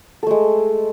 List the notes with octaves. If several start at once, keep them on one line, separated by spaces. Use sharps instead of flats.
G#3 A3 A4